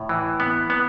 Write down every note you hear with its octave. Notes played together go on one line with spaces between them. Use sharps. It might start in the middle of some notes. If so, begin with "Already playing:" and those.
Already playing: A2
E3
B3
B3